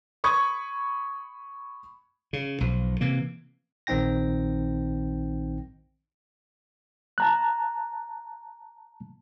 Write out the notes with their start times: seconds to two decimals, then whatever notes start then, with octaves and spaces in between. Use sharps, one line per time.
0.24 B5 C#6 D#6 G#6
2.33 C#3
2.60 B1 F3
3.01 C3 E3 A#3
3.87 A#1 D#3 C4 D#4 G5 A#6
7.18 A5 A#5 F#6